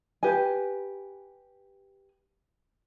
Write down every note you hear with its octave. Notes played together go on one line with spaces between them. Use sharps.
G4 B4 G#5